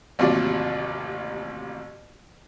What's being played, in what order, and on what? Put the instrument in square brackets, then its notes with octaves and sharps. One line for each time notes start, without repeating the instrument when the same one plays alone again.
[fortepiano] A1 D#2 C3 F#3 F4 D5